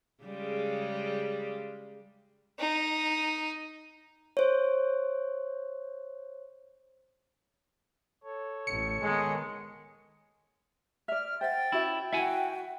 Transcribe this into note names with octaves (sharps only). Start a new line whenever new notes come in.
C#3 G3 G#3
D#4
C5 C#5
A4 C#5
A1 C#7
D#3 G#3 B3
D5 E5 F6
C5 E5 F#5 G5 A6
C#4 E4 F#4 E5
E4 F#4 E5 F#5 G#5